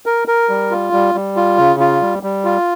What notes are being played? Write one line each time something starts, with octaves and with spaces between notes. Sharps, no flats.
A#4
A#4
G3
F4
G3
G3
F4
C#3
F4
G3
G3
F4